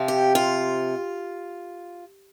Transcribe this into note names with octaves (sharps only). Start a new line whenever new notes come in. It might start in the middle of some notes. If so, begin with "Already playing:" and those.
Already playing: C3 F3
G4
F4